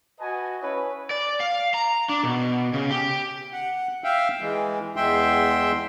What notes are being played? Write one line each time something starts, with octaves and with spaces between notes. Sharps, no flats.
F#4 B4 D#5 G#5 A5
C#4 E4 B4 C#5 G#5
D5
F5
A#5
D4
B2
C#3
G4
F#5
E5 F5 G5
E3 G#3
E2 G#3 E5 G5 C6